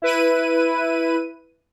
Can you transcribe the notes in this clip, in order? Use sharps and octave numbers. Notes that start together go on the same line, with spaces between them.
E4 B4 D#7